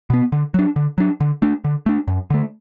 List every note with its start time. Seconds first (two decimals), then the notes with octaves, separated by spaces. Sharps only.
0.10 B2 B3
0.32 D3
0.54 F#3 D4
0.76 D3
0.98 F#3 D4
1.20 D3
1.42 A3 D4
1.64 D3
1.86 A3 D4
2.08 F#2
2.30 D3 A3